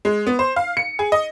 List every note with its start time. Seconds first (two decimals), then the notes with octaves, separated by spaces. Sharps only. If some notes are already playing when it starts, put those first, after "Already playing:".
0.05 G#3
0.27 B3
0.39 C5
0.56 F5
0.77 C#7
0.99 G#4
1.12 D#5